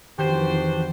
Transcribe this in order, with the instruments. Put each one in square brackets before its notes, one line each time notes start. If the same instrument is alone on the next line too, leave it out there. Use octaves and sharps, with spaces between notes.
[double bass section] F2 E3 [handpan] D#3 [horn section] D4 F#4 C5 [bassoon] G4